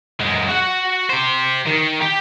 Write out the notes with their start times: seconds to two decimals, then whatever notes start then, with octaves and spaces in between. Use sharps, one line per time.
0.20 F#2 G#3
0.48 F#4 F#5
1.09 G4 C5
1.67 D#3
2.01 G4